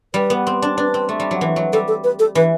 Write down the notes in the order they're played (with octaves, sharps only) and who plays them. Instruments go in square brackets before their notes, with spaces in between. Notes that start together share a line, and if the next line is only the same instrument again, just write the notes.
[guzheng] G3 [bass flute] B4
[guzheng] B3
C4
D4
[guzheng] D4 [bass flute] B4
[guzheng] C4
A3
G3
F#3
E3
F#3
[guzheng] G3 [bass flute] A4
[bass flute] A4
B4
A4
[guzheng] E3 [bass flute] B4